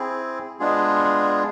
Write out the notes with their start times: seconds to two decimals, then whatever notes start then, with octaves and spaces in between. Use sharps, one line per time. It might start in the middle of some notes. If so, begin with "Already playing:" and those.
Already playing: C4 E4 G#4
0.59 G#3 B3 D4 F4 G#4